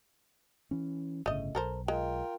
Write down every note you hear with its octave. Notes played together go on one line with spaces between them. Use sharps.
E3 C#4
G1 A2 C#3 A3 D#5
B1 A4 A#4 C5
G#3 F4 A#4 G5